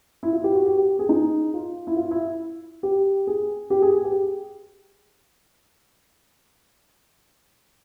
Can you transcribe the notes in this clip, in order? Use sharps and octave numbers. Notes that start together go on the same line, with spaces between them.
E4
F4
G4
F#4
G4
G4
G#4
D#4
F4
E4
F4
E4
G4
G#4
G4
G#4
G4